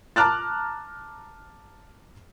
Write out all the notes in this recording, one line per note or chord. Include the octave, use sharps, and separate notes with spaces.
A5 A#5 D6 F6 F#6 A6